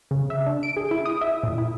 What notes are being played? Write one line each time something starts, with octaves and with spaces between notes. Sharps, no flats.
C#3
E5
D4
D7
G#4
E4
D#6
E5
A#2
E4